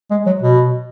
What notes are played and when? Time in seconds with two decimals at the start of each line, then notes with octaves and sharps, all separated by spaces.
0.11 G#3
0.26 F#3
0.42 B2